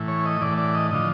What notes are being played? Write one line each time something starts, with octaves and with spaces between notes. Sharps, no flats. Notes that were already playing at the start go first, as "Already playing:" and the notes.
Already playing: A2 E3
C#5
D#5
A2 E3 D5
D5
D#5
D3 F3 D#5